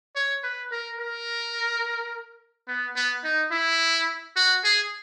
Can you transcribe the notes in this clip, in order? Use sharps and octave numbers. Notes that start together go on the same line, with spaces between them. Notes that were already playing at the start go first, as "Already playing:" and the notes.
C#5
B4
A#4
A#4
B3
B3
D#4
E4
F#4
G#4